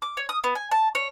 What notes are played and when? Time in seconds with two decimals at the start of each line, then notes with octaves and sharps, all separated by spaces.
0.02 D6
0.17 C#5
0.29 D#6
0.44 B3
0.55 G#5
0.71 A5
0.95 C#5